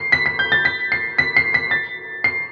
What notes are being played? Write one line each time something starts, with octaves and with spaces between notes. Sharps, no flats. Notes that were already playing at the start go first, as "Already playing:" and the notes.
Already playing: C7
B6
B6
G6
A6
B6
C7
B6
C7
B6
A6
C7